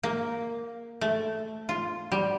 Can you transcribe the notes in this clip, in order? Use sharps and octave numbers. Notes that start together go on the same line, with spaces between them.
A#3
A3
F4
G3